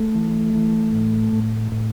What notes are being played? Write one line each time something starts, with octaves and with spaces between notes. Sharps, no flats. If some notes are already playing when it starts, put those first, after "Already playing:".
Already playing: A3
E3
E3
A2
A2
A2